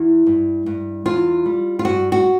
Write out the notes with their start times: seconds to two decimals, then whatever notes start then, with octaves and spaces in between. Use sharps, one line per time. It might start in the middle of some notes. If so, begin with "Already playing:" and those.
Already playing: E2 E4
0.27 G2
0.66 G2
1.06 E2 F4
1.46 G3
1.79 F4
1.85 G2 F#4
2.12 F#4